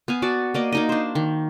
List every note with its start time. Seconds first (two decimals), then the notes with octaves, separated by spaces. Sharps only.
0.08 B3 F5 G#5
0.22 F#4 D5 A5
0.54 A#3 D5 D#5
0.72 A#3 D#4 D#5
0.89 D4 C5
1.15 D#3